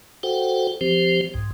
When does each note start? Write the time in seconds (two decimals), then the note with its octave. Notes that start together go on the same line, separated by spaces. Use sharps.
0.23 F#4 A4 C5 F#5 G5
0.81 F3 C4 G4 C5
1.34 C2 G#2